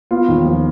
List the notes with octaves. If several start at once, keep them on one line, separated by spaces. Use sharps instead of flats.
B3 F4
D#2
F3